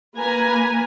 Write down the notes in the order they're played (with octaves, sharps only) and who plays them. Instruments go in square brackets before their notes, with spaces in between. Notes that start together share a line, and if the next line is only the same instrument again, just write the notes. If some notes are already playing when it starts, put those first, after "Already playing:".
[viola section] A#3 B4 G#5 A#5